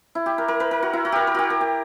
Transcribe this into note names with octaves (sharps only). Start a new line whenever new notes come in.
E4
G4
A#4
A#4
B4
A#4
F#4
E4
F#4
G4 A#4
A#4
F#4 G4
A#4
G4